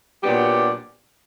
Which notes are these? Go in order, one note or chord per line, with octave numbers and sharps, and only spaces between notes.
A#2 F#3 B3 D4 G4